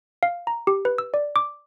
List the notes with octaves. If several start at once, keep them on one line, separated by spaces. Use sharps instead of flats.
F5
A#5
G4
B4
E6
D5
D6